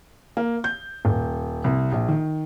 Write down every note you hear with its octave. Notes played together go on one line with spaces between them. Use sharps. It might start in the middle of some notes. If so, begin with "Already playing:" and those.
A#3
G6
D#1
C2
A#1
D#3